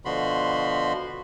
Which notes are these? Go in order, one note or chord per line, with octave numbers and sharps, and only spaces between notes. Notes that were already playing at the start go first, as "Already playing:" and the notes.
B2 D3 F3 F#4 B5 C6